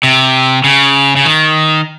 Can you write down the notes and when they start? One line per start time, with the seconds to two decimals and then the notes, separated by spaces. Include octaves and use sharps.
0.03 C3
0.64 C#3
1.16 C#3
1.25 D#3